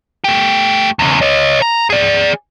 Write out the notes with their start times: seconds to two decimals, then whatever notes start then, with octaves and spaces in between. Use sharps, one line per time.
0.24 A3 G4
0.99 E2 C#3
1.22 C#5 D#5
1.62 A#5
1.90 G#4 D5